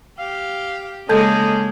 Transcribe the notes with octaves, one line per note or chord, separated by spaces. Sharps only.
G4 F5
C#3 G#3 A#3 A4 D#5 A5 G6 G#6